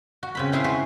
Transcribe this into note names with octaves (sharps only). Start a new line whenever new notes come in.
F#4
C#3 C4 B5
C4 E4 G#4 E5 F5
F#4 B4 C5